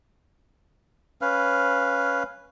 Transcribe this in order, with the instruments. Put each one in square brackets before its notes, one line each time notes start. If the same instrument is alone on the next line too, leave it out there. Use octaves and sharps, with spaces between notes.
[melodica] C#4 B4 F5